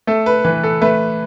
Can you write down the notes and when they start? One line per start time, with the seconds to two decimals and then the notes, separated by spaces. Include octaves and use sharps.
0.07 A3 A4
0.26 B4
0.45 E3 B4
0.63 A4
0.82 A3 B4